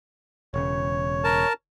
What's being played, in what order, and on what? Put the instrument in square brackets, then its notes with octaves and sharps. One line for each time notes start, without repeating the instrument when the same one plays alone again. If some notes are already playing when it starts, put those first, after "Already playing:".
[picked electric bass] E1 C#3 [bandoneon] C#5
[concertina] A#4 A5